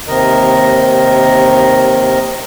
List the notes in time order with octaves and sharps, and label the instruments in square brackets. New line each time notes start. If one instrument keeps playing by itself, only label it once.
[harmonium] D#2 C3 D#3 A#4 D#5